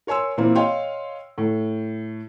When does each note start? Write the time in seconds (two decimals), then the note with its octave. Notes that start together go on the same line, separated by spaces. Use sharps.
0.07 A#4 C#5 G#5 C6 E6
0.37 A#2 E3 A#3 C4
0.55 C#5 D#5 F5 G5 C6
1.38 A2